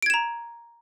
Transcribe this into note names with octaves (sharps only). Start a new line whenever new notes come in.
A#5 G#6 D7 E7